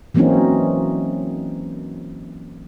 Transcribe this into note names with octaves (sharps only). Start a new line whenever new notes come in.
E3 F#3 A#3 C4 C#4 D#4